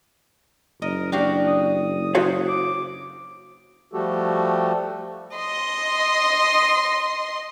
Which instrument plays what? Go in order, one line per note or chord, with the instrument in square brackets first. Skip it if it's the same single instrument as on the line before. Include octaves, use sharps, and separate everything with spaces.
[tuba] F#1 [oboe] A#4 [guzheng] D#5
[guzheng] D4 G4 F5 [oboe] F#4
[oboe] D#6
[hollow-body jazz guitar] F#4 C#5 F5 [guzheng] C5
[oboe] D6
[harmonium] F3 G3 A3 F#4 G4 A4
[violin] D#5 C6